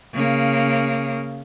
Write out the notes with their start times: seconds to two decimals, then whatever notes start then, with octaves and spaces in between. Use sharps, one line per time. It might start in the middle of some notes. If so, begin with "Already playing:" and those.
0.14 C#3 A#3